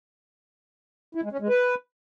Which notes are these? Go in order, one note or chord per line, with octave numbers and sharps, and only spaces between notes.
E4
G#3
C#4
G#3
B4